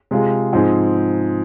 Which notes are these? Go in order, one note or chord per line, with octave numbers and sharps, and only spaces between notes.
C3 G#3 F4 G#4
G#2 F3 C4 G#4